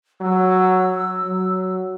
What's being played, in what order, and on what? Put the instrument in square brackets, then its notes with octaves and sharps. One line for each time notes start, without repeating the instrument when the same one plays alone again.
[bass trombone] F#3 [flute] E6
[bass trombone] F#3